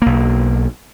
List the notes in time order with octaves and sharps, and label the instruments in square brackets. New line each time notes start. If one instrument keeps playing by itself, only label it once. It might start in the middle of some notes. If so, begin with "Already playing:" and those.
[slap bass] B1 A#3